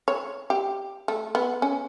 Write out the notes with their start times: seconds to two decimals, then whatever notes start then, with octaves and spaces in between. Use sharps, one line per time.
0.08 C#5
0.50 G4
1.08 A3
1.35 B3
1.62 C#4